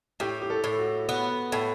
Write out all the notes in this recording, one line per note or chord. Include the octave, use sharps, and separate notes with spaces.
A2 G4
G4
A4
A2
F#4
B3
A2